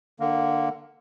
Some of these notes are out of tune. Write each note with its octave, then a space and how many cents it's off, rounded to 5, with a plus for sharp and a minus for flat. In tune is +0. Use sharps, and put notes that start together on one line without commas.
D3 +25 A#3 +0